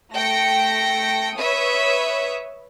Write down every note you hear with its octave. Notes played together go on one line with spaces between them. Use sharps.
A3 G5 A#6 C#7
B4 C#5 E5 D#6